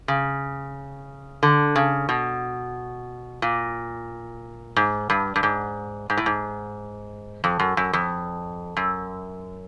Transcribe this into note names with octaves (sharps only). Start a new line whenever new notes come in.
C#3
D3
C#3
B2
A#2
G#2
G2
G2
G#2
G#2
A2
G#2
F2
F#2
F#2
F2
F#2